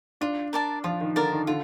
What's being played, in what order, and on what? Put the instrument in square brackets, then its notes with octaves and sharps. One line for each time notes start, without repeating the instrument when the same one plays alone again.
[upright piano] D4 [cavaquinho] F4
[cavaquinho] A#4 D5 A5
[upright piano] F3 [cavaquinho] F4
[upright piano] D#3
[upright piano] D3 [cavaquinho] A#4 D5 A5
[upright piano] D#3
[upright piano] D3 [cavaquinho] F4